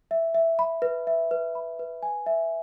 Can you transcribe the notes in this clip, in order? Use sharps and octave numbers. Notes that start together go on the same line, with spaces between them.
E5
E5
B5
B4
E5
B4
B5
B4
G#5
E5